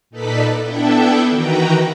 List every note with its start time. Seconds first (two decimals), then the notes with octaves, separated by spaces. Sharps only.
0.10 A#2 D#4 A4 B4 D5 B6
0.62 B3 D4 E4 A4 E5 G5
1.29 D#3 E3 F#4 B4 G5 A#5